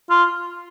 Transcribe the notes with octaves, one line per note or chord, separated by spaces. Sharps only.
F4